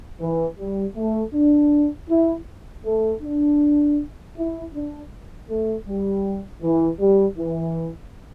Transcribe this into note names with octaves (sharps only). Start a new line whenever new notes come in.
E3
G3
A3
D4
E4
A3
D4
E4
D4
A3
G3
E3
G3
E3